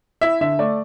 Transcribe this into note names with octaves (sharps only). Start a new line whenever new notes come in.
E4 E5
D3 E5
A3 D5